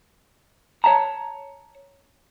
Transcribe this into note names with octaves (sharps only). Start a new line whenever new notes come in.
C#5 E5 A5 A#5